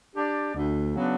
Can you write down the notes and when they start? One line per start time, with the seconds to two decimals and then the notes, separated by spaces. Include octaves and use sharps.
0.15 D4 G4 D5
0.54 D2
0.94 C#3 F#3 B3 D4